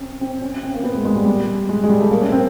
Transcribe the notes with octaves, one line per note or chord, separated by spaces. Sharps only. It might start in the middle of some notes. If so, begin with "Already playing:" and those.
Already playing: C4 C#4
C4
C#4
C4
A#3
B3
G#3
G#3
G3
G3
G#3
G#3
G3
A3
A#3
C#4
C4